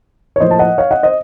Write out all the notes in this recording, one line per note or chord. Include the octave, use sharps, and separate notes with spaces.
C#5
A2 F3 A#3 C5 D#5
A5
D#5 F#5
C#5 F5
D#5 F#5
C5 D#5